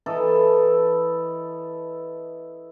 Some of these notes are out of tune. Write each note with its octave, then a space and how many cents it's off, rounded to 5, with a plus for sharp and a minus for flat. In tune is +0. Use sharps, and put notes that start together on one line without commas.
E3 +0 A4 +0 D#5 +0